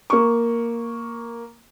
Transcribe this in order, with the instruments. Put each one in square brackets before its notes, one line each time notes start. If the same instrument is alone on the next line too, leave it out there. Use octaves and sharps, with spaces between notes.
[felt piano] A#3 C#6